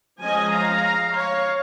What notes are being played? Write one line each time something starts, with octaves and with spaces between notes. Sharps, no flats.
F3 G#3 C#4 D#5 G#5
F5 A#5
C#5 F5